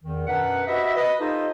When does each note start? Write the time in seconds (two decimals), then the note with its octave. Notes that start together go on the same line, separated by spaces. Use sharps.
0.03 E2 D#3
0.27 F#2 B2 D4 A#4 B4 F#5
0.68 F#4 G4 B4 C5 D#5 E5
0.96 B4 D#5
1.19 D#4 F4 G4 A4 C5 D#5